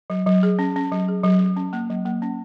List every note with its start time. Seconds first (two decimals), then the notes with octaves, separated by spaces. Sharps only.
0.10 F#3
0.26 F#3
0.43 G#4
0.59 C#4
0.76 C#4
0.92 F#3
1.08 G#4
1.24 F#3
1.40 F#3
1.56 C#4
1.73 A#3
1.90 F#3
2.05 A#3
2.22 C#4